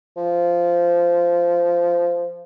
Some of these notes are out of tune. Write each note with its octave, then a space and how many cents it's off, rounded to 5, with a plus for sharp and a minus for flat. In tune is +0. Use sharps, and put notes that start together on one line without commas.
F3 -10